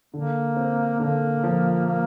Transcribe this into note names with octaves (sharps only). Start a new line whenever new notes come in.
D3 A#3
C4
D3 A#3
F3
A#3